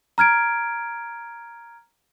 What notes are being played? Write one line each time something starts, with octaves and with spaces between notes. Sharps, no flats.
A#5 F6 G#6 D7